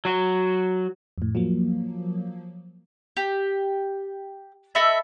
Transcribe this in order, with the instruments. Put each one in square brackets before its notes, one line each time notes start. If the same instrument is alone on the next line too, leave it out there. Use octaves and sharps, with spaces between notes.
[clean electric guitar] F#3 F#4
[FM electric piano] F2 A2
F3 F#3 A#3
[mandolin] G4
A4 D#5 E5 B5